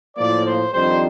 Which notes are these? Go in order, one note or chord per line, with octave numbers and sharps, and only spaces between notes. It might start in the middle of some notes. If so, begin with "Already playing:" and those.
A2 F3 A#3 F4 D5
C5
F2 D#3 G3 D4 C5